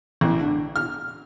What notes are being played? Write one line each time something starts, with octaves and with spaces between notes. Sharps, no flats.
A1
D3
F6